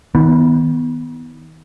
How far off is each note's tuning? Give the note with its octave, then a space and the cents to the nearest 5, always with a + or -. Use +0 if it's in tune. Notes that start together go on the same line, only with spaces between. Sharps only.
D#3 +40 B3 +0